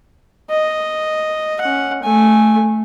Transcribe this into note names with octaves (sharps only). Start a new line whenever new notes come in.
D#5
C#4 F#5
A3 G#5